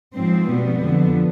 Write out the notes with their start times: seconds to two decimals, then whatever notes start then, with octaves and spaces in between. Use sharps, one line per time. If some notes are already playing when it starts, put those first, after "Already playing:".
0.14 G#2 F3 C4
0.47 B2 G3 B3
0.80 F2 D3 F3